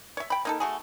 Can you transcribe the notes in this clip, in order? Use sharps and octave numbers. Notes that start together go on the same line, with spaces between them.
C#5 E5
G5 B5
A#3 D#4 A4
A3 F#4 G#4